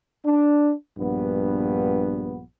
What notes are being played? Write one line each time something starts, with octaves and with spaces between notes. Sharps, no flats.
D4
A#1 G2 B3